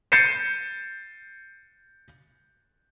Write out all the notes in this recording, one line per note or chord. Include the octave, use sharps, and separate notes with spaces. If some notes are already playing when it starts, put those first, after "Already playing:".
G6 A6 C7 C#7 D#7 E7